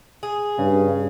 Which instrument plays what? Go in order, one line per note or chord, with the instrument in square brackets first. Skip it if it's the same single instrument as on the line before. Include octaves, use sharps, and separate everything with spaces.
[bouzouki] G#4
[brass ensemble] G2 [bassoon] C#3